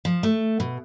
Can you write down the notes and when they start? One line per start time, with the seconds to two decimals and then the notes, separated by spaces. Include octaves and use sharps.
0.05 F3
0.23 A3
0.60 B2